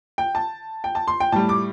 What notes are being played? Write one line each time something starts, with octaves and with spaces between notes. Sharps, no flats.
G5
A5
G5
A5
C6
G5
A2 G3 A5
D6